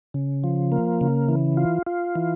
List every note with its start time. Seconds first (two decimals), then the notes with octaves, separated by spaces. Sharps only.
0.14 C#3
0.44 F3
0.72 A#3
1.01 C#3
1.29 E3
1.57 F4
1.86 F4
2.16 E3